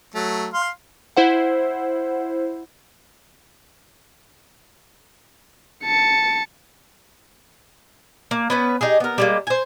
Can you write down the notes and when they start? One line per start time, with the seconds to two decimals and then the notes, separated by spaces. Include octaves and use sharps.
0.14 F#3 A3
0.53 F5 C6
1.17 E4 C5 F#5
5.85 A5 C#7
8.31 A#3
8.50 B3 C#4 B4
8.81 D#4 G4 G#4
9.00 B3 A#4
9.18 G3 G#3 A#3
9.47 C5 G#5